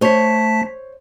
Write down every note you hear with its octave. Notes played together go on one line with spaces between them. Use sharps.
A3 C5 C#5 A5 B6